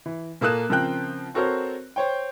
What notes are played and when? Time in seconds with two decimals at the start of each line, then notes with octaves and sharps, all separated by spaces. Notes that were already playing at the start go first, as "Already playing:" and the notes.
0.06 E3
0.41 A#2 A#3 A4 D#6 F#6 E7
0.69 C#3 F3 C4 A#4 G5 F#6
1.34 C4 F#4 A4 A#4 C5 C#5
1.96 C5 C#5 G5